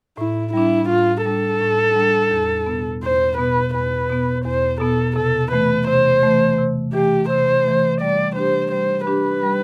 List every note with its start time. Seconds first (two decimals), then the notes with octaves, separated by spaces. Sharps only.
0.17 A2 E4
0.53 G3 D4 E4
0.89 A2 F4
1.25 G3 D4 A4
1.61 A2
1.96 G3 D4
2.31 E2
2.66 B2 B3
3.03 E2 C5
3.38 B2 B3 B4
3.74 E2 B4
4.09 B2 B3
4.45 E2 C5
4.80 B2 B3 A4
5.16 C3 A4
5.51 E3 A3 B4
5.87 C3 C5
6.23 E3 A3
6.58 C3
6.94 E3 A3 G4
7.29 C3 C5
7.65 E3 A3
8.01 G3 D5
8.36 D4 G4 C5
8.72 G3 C5
9.07 D4 G4 B4
9.43 G3